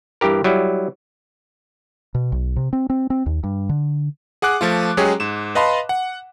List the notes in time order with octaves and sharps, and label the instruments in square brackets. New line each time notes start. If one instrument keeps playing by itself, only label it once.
[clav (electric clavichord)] G2 E3 G4 A#4
F#3 G3 E4
[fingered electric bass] B2
B1
C3
C4
C4
C4
D#2
G2
D3
[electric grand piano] G#4 F#5 D6 F#6
F3 A3 F4
F#3 G#3 C#4 G4 G#4 C#5
G#2 E7
B4 D#5 F5 A5 B5 C6
F#5